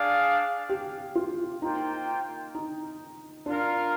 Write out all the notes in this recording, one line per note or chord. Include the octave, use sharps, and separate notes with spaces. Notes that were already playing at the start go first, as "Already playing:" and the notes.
Already playing: D4 G#4 D5 F5
G4
F4
A#3 D#4 F4 C5 G5
D#4
D4 F4 A#4 F5